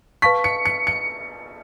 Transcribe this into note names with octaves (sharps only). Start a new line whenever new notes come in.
B4 F5 A5 C#6 B6
C#7
C#7
C#7